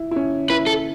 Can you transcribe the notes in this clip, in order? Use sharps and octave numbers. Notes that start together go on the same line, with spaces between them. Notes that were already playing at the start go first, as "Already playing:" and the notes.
Already playing: E4
E4
C#4
E4 B4
A4